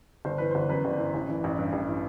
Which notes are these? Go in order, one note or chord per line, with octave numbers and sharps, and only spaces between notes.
G1 C5
E3 B4
G1 C5
F#2 B4
G1
E3
A1
E3
A1
G2
A1
E3